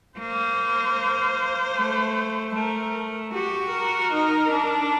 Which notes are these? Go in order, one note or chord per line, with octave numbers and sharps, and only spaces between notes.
A#3 C5
A3
A3 A#4
F#4 G4
A#4
D#4
D4